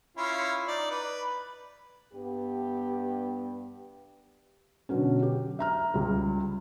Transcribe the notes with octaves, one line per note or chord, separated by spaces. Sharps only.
C#4 E4 F4
D#4 D5
B4
G2 B3 G4
B2 D3 F#3 C#4
G4
E5 A#5 F6
C#2 G3